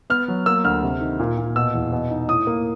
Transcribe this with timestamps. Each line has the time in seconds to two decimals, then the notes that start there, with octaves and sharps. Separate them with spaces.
0.10 B3 F6
0.28 F#3
0.46 A#3 E6
0.64 D2 F6
0.83 C3
1.01 D#3
1.19 A#2
1.38 A#2
1.56 B2 E6
1.74 E2
1.92 B2
2.11 D#4
2.28 A2 D#6
2.47 A#3